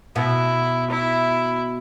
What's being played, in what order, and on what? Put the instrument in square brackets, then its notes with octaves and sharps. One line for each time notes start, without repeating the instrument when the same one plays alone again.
[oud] B2 [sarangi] E4
[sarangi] E4